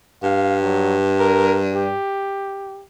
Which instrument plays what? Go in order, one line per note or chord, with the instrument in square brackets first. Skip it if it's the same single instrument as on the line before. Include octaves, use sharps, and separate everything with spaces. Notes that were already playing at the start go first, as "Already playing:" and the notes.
[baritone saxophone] G2 [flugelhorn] F5
[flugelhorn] F#3
A#4
G4